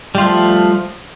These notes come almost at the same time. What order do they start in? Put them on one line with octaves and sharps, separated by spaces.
G3 F4 A3 F3